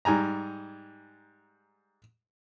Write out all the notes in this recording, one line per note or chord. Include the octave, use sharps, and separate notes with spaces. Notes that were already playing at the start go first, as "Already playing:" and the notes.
G#2 G3 G#5 A#5